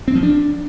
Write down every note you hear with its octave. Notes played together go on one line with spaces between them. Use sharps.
C4
F3
D4